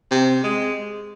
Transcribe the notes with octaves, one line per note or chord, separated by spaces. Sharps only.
C3
G#3